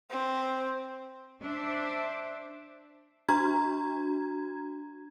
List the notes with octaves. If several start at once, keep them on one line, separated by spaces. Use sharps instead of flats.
C4
D4 C5 D5 E5
D4 F#4 A#5 G#6